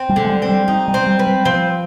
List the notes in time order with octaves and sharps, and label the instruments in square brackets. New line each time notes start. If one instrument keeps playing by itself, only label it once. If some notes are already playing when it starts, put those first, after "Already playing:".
Already playing: [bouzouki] C4
[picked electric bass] G3
[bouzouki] D3
[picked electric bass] G#3
G3
[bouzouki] C4
[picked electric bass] G3
[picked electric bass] G3 [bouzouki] D#4
[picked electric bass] G3
[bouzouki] C4
[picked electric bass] G3
[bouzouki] B4
[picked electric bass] G3
[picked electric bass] F3 [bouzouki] C4